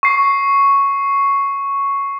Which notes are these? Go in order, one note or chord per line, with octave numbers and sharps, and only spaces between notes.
C#6 C7